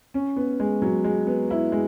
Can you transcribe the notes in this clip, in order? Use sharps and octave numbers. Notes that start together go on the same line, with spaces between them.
C#4
B3
G#3
F#3
G#3
B3
E4
G#3